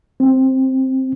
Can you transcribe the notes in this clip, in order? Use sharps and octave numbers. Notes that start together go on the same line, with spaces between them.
C4